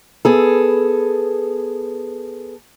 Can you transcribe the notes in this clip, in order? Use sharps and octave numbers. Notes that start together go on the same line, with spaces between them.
B3 G#4 A4